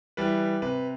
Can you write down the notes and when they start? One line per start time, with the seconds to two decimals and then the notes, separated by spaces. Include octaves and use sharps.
0.17 E3 G3 B4
0.62 C3 B4